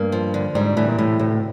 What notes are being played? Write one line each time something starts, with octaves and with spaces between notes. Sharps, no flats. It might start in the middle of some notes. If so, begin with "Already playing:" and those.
Already playing: G2 A#3
F3
D3
G#2 G3
A2 E3
A#2
A2 C3
D2 A2